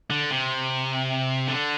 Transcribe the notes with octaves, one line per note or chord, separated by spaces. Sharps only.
D3
C3
D3